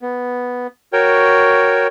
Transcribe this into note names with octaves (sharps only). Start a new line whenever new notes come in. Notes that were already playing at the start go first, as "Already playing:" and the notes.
B3
F#4 A#4 C#5 G5